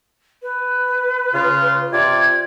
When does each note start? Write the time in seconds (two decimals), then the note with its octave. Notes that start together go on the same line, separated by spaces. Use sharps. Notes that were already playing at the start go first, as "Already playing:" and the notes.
0.42 B4
1.34 C#3 F4
1.93 C3 F4 D5 G#6